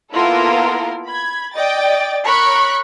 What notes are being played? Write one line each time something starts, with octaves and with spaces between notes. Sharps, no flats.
A#3 B3 E4 F4 A4 A#4
B5 G#6
D5 D#5 G5 A6
A#4 C#5 B5 C#6 F#6